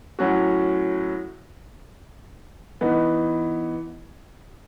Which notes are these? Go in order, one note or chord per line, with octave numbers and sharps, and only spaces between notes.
A2 F#3 C#4 F#4
E3 B3 D#4